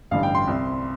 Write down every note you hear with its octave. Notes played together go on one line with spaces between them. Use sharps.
A1 G2 D3 F5
G5
C6
C2 C3